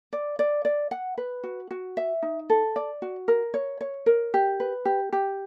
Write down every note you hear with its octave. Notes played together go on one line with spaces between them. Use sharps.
D5
D5
D5
F#5
B4
F#4
F#4
E5
D#4
A4
D5
F#4
A#4
C#5
C#5
A#4
G4
B4
G4
G4